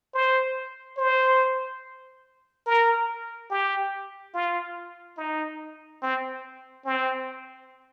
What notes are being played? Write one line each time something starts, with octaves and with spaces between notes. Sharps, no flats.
C5
C5
A#4
G4
F4
D#4
C4
C4